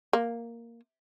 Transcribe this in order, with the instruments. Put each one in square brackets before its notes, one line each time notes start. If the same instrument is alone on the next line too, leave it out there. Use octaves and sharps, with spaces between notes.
[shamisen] A#3